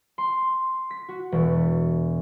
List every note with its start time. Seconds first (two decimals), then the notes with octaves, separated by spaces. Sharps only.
0.18 C6
0.91 B6
1.09 F#4
1.32 E1